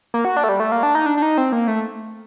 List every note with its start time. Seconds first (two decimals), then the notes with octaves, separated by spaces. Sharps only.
0.14 A#3
0.25 F#4
0.37 D4
0.44 A3
0.49 G3
0.60 A3
0.72 A#3
0.83 D4
0.95 D#4
1.06 D4
1.17 D4
1.22 D#4
1.38 C4
1.52 A#3
1.68 A3